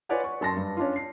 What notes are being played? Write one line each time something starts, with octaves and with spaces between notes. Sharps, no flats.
F4 B4 C#5 D5 F#5 G#5
C#6
F#2 A5 C6 A#6
G2
C#4 D4 F4
C7